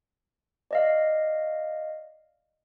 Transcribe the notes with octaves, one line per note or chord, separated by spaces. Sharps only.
D5 D#5 F5